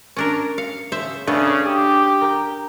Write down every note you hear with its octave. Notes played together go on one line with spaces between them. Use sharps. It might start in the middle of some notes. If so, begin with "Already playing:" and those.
C#4 D4 A#4
F5 C#7
C#3 C5 E5
C#3 A3 B3 D4
G4 D#6
A#4 G5